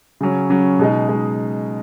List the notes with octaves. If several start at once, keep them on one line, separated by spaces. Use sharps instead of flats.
C#3 F#3 C#4
C#3 F#3 C#4
B2 G#3 D#4
G#3 D#4